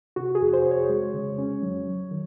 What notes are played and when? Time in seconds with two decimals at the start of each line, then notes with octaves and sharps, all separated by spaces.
0.16 C3 F#4
0.35 G#4
0.41 F2
0.53 C5
0.65 F2
0.71 C#5
0.89 G#3
1.14 C#3
1.38 C#4
1.62 F#3
1.86 F#3
2.11 D#3